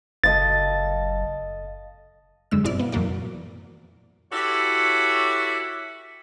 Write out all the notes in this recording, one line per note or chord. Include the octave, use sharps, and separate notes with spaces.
F#1 A4 D#5 F5 A6
F#2 D3 G#3 E6
G1 B2 C4 E4 D5 F6
F3 B3
F#2 A#2 E3 A#3 F#4 D5
E4 F#4 G4 A4 C#5